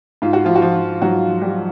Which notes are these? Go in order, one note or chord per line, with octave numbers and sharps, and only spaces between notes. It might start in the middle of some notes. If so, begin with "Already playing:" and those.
G#2 F4
F#4
G#2 F3 F4
F#4
F3 F4
F3
G#2 F#3 F#4
F3
G3 G4
F3